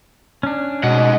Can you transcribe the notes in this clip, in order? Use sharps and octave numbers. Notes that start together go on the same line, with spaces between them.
C#4 D4
G#2 B2 D#5 F#5